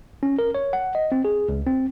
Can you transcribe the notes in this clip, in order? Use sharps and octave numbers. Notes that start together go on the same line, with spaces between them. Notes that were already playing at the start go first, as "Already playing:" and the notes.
C#4
A#4
C#5
F#5
D#5
C4
G#4
C#2
C4